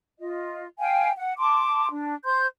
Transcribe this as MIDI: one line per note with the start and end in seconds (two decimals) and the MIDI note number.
0.20 0.65 65
0.20 0.65 75
0.79 1.10 77
0.79 1.10 79
0.79 1.10 80
1.16 1.33 78
1.38 1.87 81
1.38 1.87 84
1.38 1.87 86
1.89 2.14 62
2.24 2.46 72
2.24 2.46 84
2.24 2.46 91